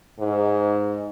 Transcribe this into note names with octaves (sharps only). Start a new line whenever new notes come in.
G#2